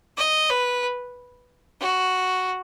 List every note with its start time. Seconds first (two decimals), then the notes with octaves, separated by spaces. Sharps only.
0.17 D#5
0.50 B4
1.81 F#4